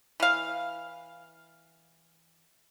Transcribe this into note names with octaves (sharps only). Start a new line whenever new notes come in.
E3 F5